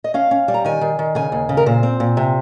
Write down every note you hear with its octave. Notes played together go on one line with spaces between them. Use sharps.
D#5
C#4 F5
C#4
G3
A#5
D#3 G#5
D#3
D#3
C#3 G#5
D#2
C#3
A#4
A#2 C5
C4
A#2
C3